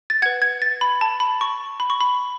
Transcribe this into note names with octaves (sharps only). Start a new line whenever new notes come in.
A6
B4 F#5 G#6
G#6
A6
B5
A5
B5
C#6
B5
C#6
B5